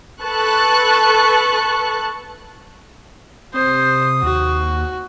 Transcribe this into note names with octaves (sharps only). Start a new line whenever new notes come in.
A4 B4 A5 C#6 F#6
C3 C5 D#6
D#2 F#4